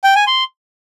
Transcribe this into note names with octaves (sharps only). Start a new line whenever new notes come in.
G5
G#5
C6